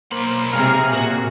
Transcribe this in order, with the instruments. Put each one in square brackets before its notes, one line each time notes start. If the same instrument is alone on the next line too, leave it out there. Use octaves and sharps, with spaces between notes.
[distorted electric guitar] B1 B5 [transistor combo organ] A#3 C5
[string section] C3 G#4 [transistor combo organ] F5 A#5
[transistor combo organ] A#2 [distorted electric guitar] F#4